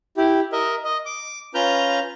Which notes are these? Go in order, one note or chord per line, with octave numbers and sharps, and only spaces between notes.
E4 G4
A#4 D#5 E5
D#5
D6
C#4 F4 B4 A#5 F6 G6